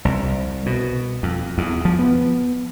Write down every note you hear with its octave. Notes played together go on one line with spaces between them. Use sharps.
C2
B2
F2
E2
F3
B3